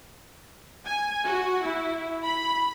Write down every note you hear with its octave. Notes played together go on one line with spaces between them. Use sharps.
G#5
F#4
E4
B5